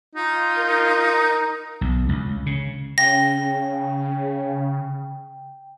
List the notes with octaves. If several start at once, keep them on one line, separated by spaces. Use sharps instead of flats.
D#4 F4
A#4
B1
C#2
C#3
C#3 G5 A#6